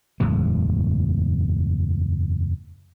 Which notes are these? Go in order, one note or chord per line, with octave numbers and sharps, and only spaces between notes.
F#1 E2 A2 G#3